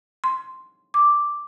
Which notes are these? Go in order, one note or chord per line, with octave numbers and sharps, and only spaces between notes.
C6
D6